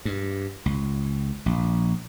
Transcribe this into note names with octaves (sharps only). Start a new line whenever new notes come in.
G2
C#2
A#1